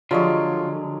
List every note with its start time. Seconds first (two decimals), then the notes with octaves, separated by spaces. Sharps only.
0.11 D3 F3 F#3 G#3 F4 G4 C#5 D5